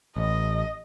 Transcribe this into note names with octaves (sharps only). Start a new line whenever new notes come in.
A1 D#5